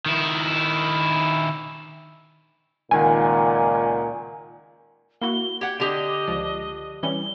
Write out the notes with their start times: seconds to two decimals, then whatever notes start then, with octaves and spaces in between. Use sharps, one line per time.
0.06 D#3 E4
2.91 C#2 A#2 D#3 F#5 G#5
5.22 A#3 E4 F#4 G7
5.61 G4 F#5 G#6
5.80 D3 G4 D#5
6.27 C#2 F3 D5
7.03 E3 G3 C#4 G7